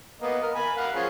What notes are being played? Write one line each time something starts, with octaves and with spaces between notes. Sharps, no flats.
A#3 B3 D#5
A#4
G#5 B5
A#4 F5 F#5
F3 C#4 G#4